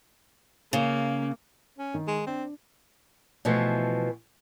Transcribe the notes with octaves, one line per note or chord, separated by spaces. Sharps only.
C#3 A#3
C#4
D#3
G#3
C4 D4
B2 E3 F3 A3 B3